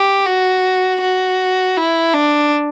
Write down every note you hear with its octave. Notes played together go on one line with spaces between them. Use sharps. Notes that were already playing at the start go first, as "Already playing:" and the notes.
Already playing: G4
F#4
F#4
E4
D4